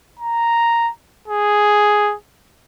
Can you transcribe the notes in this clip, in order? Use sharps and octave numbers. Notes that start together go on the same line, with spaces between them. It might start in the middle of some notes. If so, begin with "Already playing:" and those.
A#5
G#4